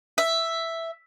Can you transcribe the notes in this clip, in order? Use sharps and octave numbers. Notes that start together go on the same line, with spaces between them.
E5